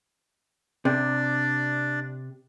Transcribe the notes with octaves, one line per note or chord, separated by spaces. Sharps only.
C3 D4 D5